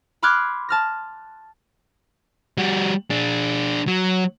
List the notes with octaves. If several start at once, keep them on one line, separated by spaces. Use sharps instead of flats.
B5 C6 D6 F6 F#6 G#6
A5 F6 A#6
G3 F#4
D4 G#4
F#3